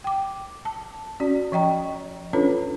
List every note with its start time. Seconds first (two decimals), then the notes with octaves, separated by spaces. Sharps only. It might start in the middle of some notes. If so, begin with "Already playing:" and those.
0.04 G5 D6
0.65 A5
1.20 C#4 F#4 D5
1.52 F3 D#5 G5 A#5
2.33 C#4 D4 F4 A4 B4 C#5